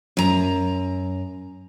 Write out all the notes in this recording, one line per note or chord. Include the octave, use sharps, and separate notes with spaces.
F#2 A#5